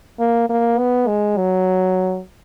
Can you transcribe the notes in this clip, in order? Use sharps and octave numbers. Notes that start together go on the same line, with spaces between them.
A#3
A#3
B3
G#3
F#3